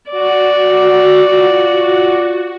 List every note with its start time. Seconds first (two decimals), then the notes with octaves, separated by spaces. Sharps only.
0.11 F#4 D5
1.18 F4